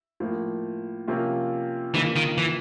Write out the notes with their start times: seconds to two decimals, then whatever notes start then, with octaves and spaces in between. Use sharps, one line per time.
0.20 A2 F3 A#3
1.08 C3 F3 A#3 C#4 F4
1.94 C#3 E3 F3 A#3 D#4
2.16 D#3
2.38 E3